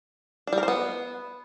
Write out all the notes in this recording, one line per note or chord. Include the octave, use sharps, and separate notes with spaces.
D4
G3
A#4
C5
B3